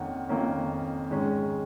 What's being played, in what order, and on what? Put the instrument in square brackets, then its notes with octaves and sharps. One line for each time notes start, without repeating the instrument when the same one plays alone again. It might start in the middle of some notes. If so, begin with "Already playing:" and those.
Already playing: [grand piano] F2 D#3 A#3 C#4 F#5
F2 D#3 A#3 C#4
G#2 D#3 G#3 C#4